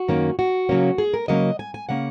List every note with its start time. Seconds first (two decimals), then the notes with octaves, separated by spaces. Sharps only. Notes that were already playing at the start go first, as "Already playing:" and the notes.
Already playing: F#4
0.08 F#2 D#3 A#3 C#4
0.39 F#4
0.69 C#3 F#3 A#3 C#4
0.98 G#4
1.14 A#4
1.28 C#3 F#3 A#3 C#4 D#5
1.59 G#5
1.74 G#5
1.89 C#3 A#3 C#4 F#5